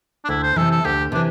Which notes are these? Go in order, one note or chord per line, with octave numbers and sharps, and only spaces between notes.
D4
D2 E4
C5
C3 E3 A4
A4
D2 G4
C3 E3 D4